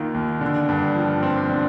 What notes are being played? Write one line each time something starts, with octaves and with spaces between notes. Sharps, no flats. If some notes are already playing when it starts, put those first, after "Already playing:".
Already playing: D#2 D#3 A#3 F4
D#2
D3
G2
F3
C4
D3